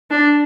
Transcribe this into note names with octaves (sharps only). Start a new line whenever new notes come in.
D4